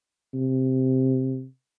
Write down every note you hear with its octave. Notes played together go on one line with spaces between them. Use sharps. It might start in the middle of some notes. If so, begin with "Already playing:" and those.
C3